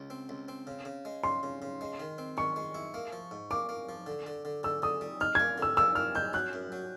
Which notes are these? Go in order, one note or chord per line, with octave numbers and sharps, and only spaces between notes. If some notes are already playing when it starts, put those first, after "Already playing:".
Already playing: C#2
C4
C#2
C4
C#3
C#3
G#3
C#3 C6
C#3
C#3
G#3
D#3
C4
D#3 C#6
G#3
E4
A#3
F3
G#2
A#3 D6
A#3
F3
D3
D3
D3
D3 E6
D3 D#6
G3
D#4 F6
A#3 G#6
D3 E6
A#3 E6
A#3 F6
D#4 G6
F#3 F#6
F#2
F#3